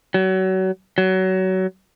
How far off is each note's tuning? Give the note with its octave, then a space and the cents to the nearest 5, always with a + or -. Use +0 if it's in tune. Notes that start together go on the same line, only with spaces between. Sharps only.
F#3 +30
F#3 +25